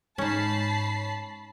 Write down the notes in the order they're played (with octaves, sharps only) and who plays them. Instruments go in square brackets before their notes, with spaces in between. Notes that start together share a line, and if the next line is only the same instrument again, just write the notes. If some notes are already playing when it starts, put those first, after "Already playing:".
[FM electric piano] G#2 C#5 [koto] C#4 D#4 [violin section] A5 B5 C7